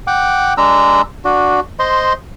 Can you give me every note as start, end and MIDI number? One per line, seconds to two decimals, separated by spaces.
0.07 0.53 78
0.07 0.53 79
0.07 0.53 86
0.57 1.01 56
0.57 1.01 62
0.57 1.01 82
0.57 1.01 88
1.25 1.60 62
1.25 1.60 66
1.79 2.13 72
1.79 2.13 75
1.79 2.13 84